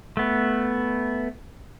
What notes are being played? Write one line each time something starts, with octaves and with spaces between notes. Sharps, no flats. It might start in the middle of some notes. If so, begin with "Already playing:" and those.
A3 B3